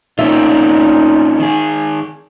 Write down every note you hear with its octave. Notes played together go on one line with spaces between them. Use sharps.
A#2 C4 C#4 D#4 F4 E5
D#3 G#4